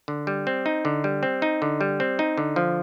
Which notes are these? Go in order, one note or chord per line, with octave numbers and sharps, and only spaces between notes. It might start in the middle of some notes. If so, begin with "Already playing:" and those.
D3
G3
C4
D#4
D3
G3
C4
D#4
D3
G3
C4
D#4
D3
F3